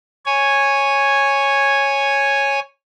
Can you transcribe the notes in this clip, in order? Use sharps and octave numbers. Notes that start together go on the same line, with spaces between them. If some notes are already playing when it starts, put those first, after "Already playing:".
C#5 G#5